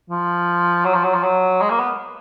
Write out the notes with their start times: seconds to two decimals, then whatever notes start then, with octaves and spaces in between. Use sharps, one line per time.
0.10 F3
0.85 F#3
0.94 F3
1.04 F#3
1.14 F3
1.23 F#3
1.61 G#3
1.70 A#3
1.79 B3